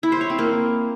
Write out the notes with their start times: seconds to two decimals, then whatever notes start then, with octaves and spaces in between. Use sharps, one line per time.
0.03 E4
0.12 C5
0.21 C#5
0.30 C4
0.39 A#3